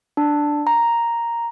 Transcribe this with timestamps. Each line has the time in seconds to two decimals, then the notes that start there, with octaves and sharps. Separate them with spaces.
0.17 D4
0.67 A#5